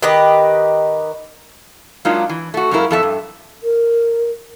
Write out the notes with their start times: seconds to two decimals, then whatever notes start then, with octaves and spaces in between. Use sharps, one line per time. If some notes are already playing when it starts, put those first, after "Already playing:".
0.02 D#3 G4 B4 D#5
2.05 F#3 G#3 A#3 D4 D#4 F4
2.29 E3
2.54 A3 F#4
2.71 F#2 G#3 A#3 E4 A#4
2.91 F2 A4 E5
3.03 G2
3.63 A#4